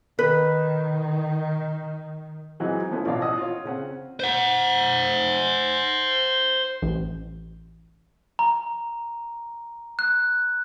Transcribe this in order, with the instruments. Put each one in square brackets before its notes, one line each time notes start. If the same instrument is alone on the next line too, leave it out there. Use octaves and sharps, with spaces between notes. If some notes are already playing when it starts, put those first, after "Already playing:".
[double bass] D#3 [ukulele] B4
[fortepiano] E3 F#3 G#3 C4 D#4
F3 A3 B3 C#4 E4
A1 B2 F3 C#5 D5 F5
D#5 F#5 D#6 E6
F4 C#5
C#3 C4 C#4 F#5
[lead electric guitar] C5 F#5
[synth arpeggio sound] A1
[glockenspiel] A#5
F#6